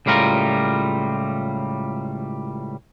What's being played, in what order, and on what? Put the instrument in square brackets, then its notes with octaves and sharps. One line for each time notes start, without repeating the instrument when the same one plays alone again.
[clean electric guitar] C#2 A2 G3 F4 A#4